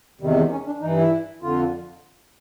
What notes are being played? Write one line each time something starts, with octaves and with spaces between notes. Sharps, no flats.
E2 C3 D#3 G3
G#3
C#4
D4
G2 E3 D#4
E4
F2 D3 F4